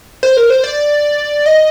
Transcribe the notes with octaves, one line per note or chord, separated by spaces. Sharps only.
C5
A#4
C5
D5
D#5